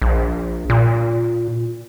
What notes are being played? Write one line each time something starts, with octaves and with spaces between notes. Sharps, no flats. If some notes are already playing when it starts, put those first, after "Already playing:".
A#1
A#2